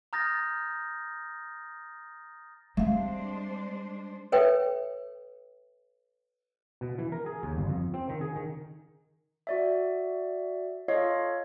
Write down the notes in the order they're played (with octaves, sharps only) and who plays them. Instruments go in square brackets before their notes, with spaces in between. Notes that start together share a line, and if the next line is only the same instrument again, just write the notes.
[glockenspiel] A#5 D#6 F6 G6 A6 A#6
[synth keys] G3 [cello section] G#3 D4 C5 [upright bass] C4 [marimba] E5 F5
[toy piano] A4 B4 C#5 E5 G5
[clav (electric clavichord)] B2
E3
A#4
G#4
D#2
G1
F2
C4
D#3
G#4
D#3
[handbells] F#4 D5 E5
F4 A4 C#5 D#5 F5